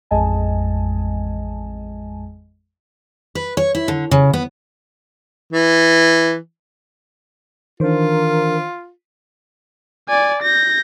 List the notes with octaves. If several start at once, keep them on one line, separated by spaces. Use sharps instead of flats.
A1 F2 G#3 D#5 G#5 A5
B4
C#5
E4
D3
C#3
B3
E3
D#3 E3 D4 F4 A#4 C5
D5 G#5
G6 A#6